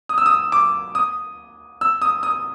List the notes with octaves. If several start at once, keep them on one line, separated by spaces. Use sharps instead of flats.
D#6
E6
D#6
D6
D#6
E6
D#6
D#6